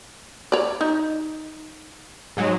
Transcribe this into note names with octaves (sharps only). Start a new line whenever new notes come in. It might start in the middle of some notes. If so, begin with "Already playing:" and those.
C#5 D5
D#4
G#2 F#3 G#3